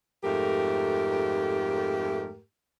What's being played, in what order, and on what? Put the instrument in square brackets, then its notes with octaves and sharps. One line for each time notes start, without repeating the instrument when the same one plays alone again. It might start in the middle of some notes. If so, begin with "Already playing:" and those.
[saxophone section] F2 G#2 A3 G4 A#4